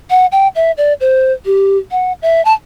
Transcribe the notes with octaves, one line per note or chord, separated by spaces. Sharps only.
F#5
G5
E5
D5
C5
G4
F#5
E5
A5